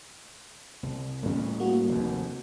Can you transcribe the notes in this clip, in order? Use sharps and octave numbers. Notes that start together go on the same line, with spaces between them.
C2
A2 G3 C#4
A#3 F#4
F1 D#2